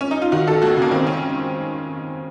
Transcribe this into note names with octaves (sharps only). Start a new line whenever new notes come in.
C#4
D#4
F4
D#3 F#4
D#3 A4
D#2 F#4
C#3 A#3
D#3 C4
C#4